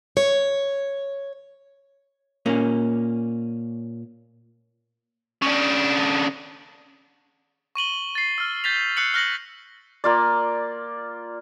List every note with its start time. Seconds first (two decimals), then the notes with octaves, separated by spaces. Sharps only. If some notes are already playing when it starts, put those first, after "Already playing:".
0.17 C#5
2.46 A#2 A#3 C#4
5.42 C#3 D4
7.75 C#6 D#7 F#7 G7
8.15 A6 C7
8.38 E6 F6
8.64 G6 A6 B6 F7
8.97 E6 F#6 C7 C#7 F#7
9.14 F6 F#6 A#6 C#7 F#7
10.04 A#3 F4 D5